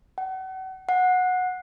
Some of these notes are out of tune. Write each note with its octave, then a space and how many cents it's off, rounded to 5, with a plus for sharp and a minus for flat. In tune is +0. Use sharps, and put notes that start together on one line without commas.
F#5 +35
F#5 -15